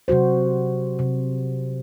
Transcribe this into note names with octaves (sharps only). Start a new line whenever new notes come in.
C3 F#3 F#4 C5
C3